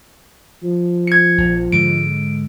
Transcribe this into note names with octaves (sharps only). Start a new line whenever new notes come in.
F3
G#6 C#7
A#1
G#2 D3 G#3 D7